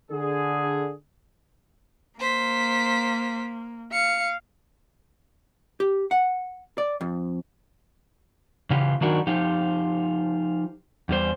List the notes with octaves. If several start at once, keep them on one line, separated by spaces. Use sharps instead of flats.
D3 G#4
A#3 C5 B6
F5 C#7
G4
F#5
D5
F2
C#3 E3 F4 G4
D#3 F#3 D4 D#4 F#4 A#4
F3 D#4 F4 G4
E2 G3 C5